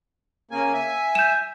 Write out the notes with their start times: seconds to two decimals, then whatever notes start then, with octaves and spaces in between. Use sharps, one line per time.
0.51 C#3 A#3 G#5
0.74 E5 G#5
1.15 G6 E7